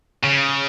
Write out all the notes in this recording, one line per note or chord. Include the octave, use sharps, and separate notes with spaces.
C#3